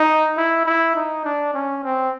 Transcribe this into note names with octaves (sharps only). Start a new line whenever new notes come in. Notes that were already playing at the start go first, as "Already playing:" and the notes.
Already playing: D#4
E4
E4
D#4
D4
C#4
C4